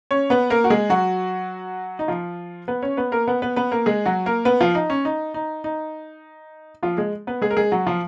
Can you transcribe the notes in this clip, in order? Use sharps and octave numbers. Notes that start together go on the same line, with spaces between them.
C#4 C#5
B3 B4
A#3 A#4
F#4
G#3 G#4
F#3 F#4
D#4
F3 F4
B3 B4
C#4 C#5
B3 B4
A#3 A#4
B3 B4
B3 B4
B3 B4
A#3 A#4
G#3 G#4
F#3 F#4
A#3 A#4
B3 B4
F3 F4
D#4
C#4
D#4
D#4
D#4
F3 F4
G#3 G#4
B3 B4
G#3 G#4
A#4
G#3 G#4
F#3 F#4
F3 F4